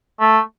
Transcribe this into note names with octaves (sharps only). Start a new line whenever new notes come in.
A3